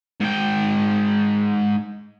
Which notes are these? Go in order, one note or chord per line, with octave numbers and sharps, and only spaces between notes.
G#2 G5